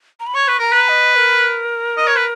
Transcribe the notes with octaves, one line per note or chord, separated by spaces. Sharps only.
A#5
B5
C#5 C#6
B4
A#4 A#5
B4
D#5
A#4
D#5
C#5
B4